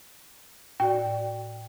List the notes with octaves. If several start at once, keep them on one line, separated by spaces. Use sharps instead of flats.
A2 F#4 D5 G5